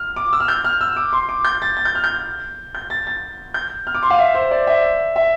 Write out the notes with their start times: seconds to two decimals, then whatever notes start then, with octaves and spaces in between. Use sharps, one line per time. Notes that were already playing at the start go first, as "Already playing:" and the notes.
Already playing: F6
0.16 D6
0.33 E6
0.40 F6
0.48 G6
0.64 F6
0.81 E6
0.96 D6
1.13 C6
1.29 D6
1.44 G6
1.62 A6
1.77 A6
1.85 G6
1.95 F6
2.04 G6
2.75 G6
2.90 A6
3.07 A6
3.54 G6
3.87 F6
3.95 D6
4.03 C6
4.10 F5
4.19 E5
4.34 C5
4.51 D5
4.67 E5
5.16 E5